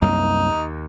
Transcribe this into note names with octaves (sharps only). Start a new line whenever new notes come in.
C2 F#2 A#3 D#4
D#2